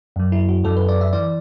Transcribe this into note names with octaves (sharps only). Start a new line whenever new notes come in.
F#2 F#3
E4
F#4
F#2 F#3 A4
B4
D5
E5
E3 D5